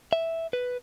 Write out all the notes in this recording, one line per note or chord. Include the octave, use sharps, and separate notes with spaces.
E5
B4